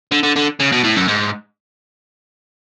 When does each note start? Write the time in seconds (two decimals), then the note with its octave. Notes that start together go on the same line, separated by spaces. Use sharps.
0.12 D3
0.23 D3
0.36 D3
0.60 C#3
0.73 B2
0.84 A2
0.96 F#2
1.09 G#2